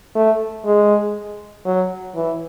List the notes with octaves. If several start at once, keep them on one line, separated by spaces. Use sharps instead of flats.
A3
G#3
F#3
E3